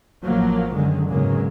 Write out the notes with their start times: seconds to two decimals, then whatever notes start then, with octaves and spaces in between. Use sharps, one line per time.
0.22 A1 F3 F#3 A#3
0.75 F#2 D3 D#3 G#3
1.09 G#1 E2 C#3 F#3 G#3 A#3